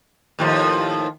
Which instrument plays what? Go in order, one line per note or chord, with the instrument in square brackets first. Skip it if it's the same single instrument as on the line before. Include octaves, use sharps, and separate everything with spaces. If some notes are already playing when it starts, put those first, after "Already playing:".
[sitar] D#2 A2 F3